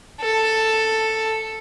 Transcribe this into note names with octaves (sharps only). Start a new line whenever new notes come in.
A4